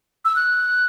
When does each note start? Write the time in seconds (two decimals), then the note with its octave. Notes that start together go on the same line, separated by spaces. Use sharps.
0.25 E6
0.36 F#6